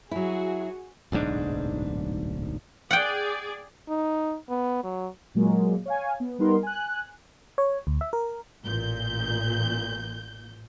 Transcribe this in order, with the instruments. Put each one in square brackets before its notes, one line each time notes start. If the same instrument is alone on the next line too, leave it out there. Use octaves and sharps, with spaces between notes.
[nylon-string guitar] F#3 E4 [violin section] F#4 G#4
[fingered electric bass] D1 B1 G#2 D4
[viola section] G#4 D5 [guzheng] F#5 G5
[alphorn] D#4
B3
F#3
[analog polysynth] A#2 F#3 G#3 A#3
C#5 F5 G#5
B3
G3 B3 D#4 A#4 C6
G#5 F#6
[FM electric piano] C#5
D2
E5
A#4
[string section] A1 A#2 G6